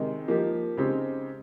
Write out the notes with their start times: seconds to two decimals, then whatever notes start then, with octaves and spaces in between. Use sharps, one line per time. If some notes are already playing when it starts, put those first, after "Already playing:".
Already playing: C3 D#3 G#3 D#4
0.28 F3 A#3 D#4 G4
0.77 C#3 G#3 C4 D#4 G4